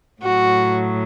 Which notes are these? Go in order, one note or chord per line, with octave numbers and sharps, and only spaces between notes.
A2 F#3 F#4